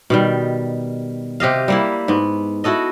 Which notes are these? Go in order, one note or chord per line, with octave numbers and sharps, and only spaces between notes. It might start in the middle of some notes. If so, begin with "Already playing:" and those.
B2 D#3 G3
C3 G4 D#5 F5
G3 A#3 E4
G#2 B3
E4 F#4 A4 D#5